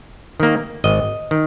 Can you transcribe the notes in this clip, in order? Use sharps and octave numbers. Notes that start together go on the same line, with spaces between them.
D#3 A#3
G#1 D#5
D#3